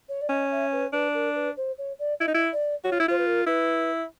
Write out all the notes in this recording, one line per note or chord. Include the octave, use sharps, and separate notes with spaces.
C#5
D5
C#4 D#5
E5
B4
D4 B4
A#4
B4
C5
C#5
D5
E4 D#5
D#4
E4
D5
F#4 C#5
F4
E4
F4 C5
B4
A#4
E4 B4